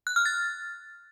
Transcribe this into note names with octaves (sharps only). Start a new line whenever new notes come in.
F#6
F6
A6